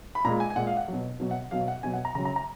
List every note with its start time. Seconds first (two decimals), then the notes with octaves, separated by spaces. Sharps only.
0.15 B5
0.25 A#2 A#5
0.28 G#3
0.40 G#5
0.50 G#5
0.56 A#2 G#3 F#5
0.67 F5
0.77 F#5
0.88 B2 F#3
1.20 B2 F#3
1.31 F#5
1.51 B2 F#3 F5
1.68 F#5
1.83 B2 F#3 G#5
1.93 F#5
2.05 A#5
2.15 C#3 A#5
2.18 F#3
2.25 A#5
2.36 A#5